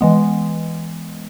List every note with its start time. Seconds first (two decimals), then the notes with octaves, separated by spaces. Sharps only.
0.01 E3 G#3 B3